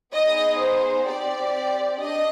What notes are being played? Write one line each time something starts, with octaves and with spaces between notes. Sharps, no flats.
B3 D#4 G#4 D#5
C5
C4 G4 D5
D4 D#5